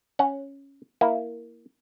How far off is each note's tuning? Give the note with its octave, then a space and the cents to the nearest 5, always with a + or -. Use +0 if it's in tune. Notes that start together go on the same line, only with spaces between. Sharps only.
C#4 +0 F#5 +0
A#3 +0 E4 +0